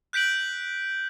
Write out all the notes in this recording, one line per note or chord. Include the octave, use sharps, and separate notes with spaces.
F#6 G6 B6 D7 F#7